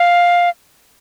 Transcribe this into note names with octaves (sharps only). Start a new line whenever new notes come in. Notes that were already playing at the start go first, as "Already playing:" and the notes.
Already playing: F5